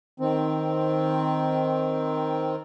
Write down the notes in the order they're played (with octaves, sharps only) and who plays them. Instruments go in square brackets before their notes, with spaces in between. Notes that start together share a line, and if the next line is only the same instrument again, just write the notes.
[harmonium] D#3 C4